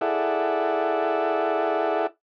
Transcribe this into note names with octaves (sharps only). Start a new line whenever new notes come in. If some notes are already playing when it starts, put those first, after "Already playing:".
E4 G#4 A4 D5 E5 F#5